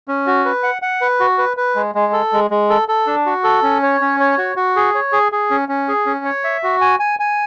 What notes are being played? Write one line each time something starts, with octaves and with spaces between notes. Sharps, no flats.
C#4
F#4
B4
F#5
F#5
B4
F#4
B4
B4
G#3
G#3
A4
G#3
G#3
A4
A4
D4
F#4
A4
C#4
C#5
C#4
C#5
F#4
F#4
G#4
C#5
G#4
G#4
C#4
C#4
G#4
C#4
C#5
E5
F#4
G#5
G#5
G#5